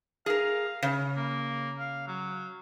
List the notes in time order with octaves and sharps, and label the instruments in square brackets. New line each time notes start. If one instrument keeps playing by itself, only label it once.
[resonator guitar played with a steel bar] G#4 A#4 [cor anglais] F5
[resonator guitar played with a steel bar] C#3
[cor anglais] A#3
F5
F#3